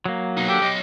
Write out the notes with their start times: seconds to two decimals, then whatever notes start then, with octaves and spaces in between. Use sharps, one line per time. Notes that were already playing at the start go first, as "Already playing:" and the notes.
0.06 F#3 A#3
0.37 B1 D#4
0.49 G4 A4 D5
0.62 F#3 D#5